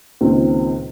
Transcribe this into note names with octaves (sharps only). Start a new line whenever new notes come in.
C#2 A#2 D#3 C4